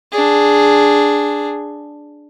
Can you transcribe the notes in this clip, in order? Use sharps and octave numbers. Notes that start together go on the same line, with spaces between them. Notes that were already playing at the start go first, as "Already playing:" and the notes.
D4 G#4